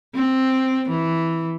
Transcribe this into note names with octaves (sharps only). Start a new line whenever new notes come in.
C4
E3